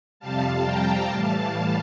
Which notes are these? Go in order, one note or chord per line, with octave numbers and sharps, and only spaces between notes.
F2 C3 G3 F5 A5
G5 A#5
A2 E3 G3 F5 A5